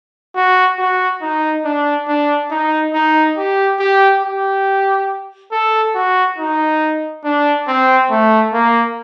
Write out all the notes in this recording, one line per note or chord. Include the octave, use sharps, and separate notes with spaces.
F#4
F#4
D#4
D4
D4
D#4
D#4
G4
G4
G4
A4
F#4
D#4
D4
C4
A3
A#3